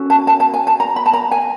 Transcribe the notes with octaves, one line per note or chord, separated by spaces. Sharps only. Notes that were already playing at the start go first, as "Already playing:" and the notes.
Already playing: C#4 F#4 A4
A5
A5
A5
G#5
A5
A#5
B5
A5
A#5
G#5